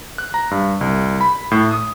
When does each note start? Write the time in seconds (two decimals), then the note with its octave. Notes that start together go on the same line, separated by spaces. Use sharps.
0.18 F#6
0.34 A#5
0.51 G2
0.81 C2
1.21 B5
1.51 A2
1.71 D#6